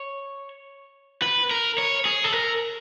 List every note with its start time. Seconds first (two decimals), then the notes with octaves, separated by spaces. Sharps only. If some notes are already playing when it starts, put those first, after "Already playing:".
Already playing: C#5
1.22 B4
1.51 A#4
1.78 C#5
2.05 G#4
2.24 A4
2.33 A#4